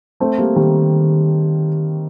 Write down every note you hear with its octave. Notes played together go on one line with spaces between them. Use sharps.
A3 C4
G3 A#3
D#3 G3